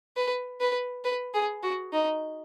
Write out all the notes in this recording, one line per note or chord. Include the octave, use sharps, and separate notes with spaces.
B4
B4
B4
G#4
F#4
D#4